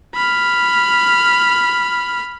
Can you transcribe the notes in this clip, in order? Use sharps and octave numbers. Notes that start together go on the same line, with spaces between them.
B5 F6